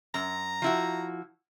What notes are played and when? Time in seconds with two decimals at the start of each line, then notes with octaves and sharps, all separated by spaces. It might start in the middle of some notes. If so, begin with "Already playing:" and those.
0.14 F#2 A#5
0.62 F3 E4 F#4